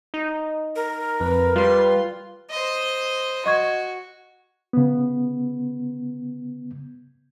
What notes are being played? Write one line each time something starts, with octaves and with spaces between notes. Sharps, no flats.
D#4
A#4
F2 B4
G3 F4 B4 C6
C5 D#5
F#4 D#5 C#6 G#6
C#3 B3